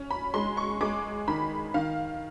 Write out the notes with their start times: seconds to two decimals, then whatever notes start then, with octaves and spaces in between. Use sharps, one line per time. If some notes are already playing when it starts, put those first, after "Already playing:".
Already playing: C#4
0.11 B5
0.34 G#3 C6
0.57 C#6
0.81 G#3 D6
1.28 D#3 B5
1.74 D#3 F5